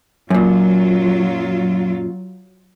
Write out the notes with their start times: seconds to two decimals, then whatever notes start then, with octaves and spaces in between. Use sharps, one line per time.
0.30 F#2 A#2 F#3 F4